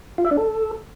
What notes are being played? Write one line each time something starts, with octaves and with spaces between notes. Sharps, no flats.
F4
E5
D4
A4